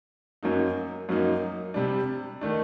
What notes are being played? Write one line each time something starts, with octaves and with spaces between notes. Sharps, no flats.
F#2 F#3 A#3 D#4
F#2 F#3 A#3 D#4
C3 G3 D4
D#3 A3 D4